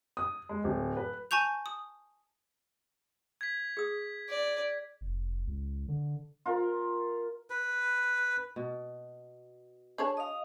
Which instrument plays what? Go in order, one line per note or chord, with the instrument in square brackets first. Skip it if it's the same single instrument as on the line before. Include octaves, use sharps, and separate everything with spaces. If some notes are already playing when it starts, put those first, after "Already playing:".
[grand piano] D#6
G#3
D1
B4
[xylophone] G#5 A5 C#6 G6 F7
D#6
[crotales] G#6 B6
[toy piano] G#4 D#6
[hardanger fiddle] D5
[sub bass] F1
C#2
D3
[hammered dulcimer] F4 A#4
[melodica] B4
[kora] B2
[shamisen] D4 G#4 C#5 [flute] A5
[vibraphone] D#5 F5 [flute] D#6